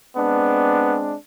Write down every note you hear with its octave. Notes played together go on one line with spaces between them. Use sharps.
G#3 B3 C4 D4